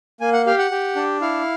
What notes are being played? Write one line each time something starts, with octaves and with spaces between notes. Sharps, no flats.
A#3 G#5
F#5
G4 F5
F#5
G4
D4
E4 F5